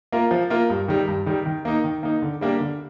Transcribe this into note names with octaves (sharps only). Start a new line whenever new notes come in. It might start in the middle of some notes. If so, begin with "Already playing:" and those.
A#3 F4 A#4
F3
A#3 F4 A#4
G2
D#3 G3
G2
D#3 G3
D#3
A#3 D#4
D#3
A#3 D#4
D3
G3 A#3 D4 G4
D3